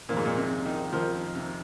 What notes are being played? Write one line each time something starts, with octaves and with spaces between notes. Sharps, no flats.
F2 A#2 D#3 C4 F4 A#4
G#2
A#2
C3
D#3
F2 D#3 F3 C4 F4 A#4
C3